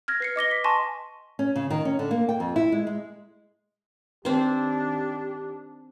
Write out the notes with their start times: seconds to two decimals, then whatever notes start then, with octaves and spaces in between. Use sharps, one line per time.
0.08 F6 G#6 A#6
0.20 B4 C7 C#7
0.36 D#5 D6 A#6 G7
0.51 B6
0.64 G#5 A5 C6 C#6 A#6
1.39 C#4
1.56 C#3
1.70 D#3
1.85 C#4
1.99 D3
2.11 A#3
2.29 G5
2.40 F2
2.56 E4
2.72 G#3
2.87 G#3
4.25 D#3 C4 D4 G4 C5